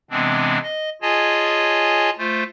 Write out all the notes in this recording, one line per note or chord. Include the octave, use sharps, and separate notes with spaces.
C3 E3 G#3 B3 C4 D4
D#5
F4 G#4 C#5 D#5 G#5 A5
A3 F4 C5